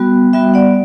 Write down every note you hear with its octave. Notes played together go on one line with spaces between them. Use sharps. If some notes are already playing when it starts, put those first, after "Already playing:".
Already playing: G3 B3 F#4
G3 B3 F#4 E5 G5
D5 F#5